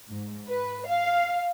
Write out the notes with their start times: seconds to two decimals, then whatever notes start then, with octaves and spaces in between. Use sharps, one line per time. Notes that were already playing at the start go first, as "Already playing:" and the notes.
0.11 G#2
0.49 B4
0.87 F5